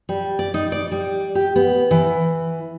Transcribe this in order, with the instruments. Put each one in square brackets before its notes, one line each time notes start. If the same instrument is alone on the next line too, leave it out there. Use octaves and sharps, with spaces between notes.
[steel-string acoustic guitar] G3
D5
D#4
D5
G3
G4
B3
E3